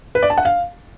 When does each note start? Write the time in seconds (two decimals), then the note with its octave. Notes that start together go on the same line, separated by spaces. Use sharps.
0.15 B4
0.23 D5
0.30 A5
0.38 F#5
0.45 F5